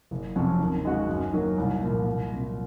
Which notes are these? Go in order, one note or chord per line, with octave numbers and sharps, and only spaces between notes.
F#1
F2 C3 F#3 C#4
D#2
C#3 G#3 D#4 F#4
F#2
D#3 F#3 A#3
C2
A#2 F3 A#3
C2
C3 F#3 A#3 F4